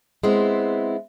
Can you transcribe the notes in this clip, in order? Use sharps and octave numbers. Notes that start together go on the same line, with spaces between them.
G#3 B3 C4 E4